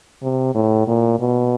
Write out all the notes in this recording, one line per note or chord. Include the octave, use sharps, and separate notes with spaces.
C3
A2
A#2
B2